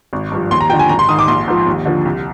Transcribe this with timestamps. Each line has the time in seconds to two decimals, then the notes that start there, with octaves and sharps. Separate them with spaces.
0.13 G#1
0.32 G2 F3
0.51 D#2 C6
0.61 A#5
0.70 D3 F3 G5
0.79 G#5
0.89 G#1 A#5
0.99 C6
1.09 G#2 D#3 D#6
1.19 D6
1.28 A#1 C6
1.48 G#2 F3
1.67 D#2
1.86 D3 F3
2.05 C2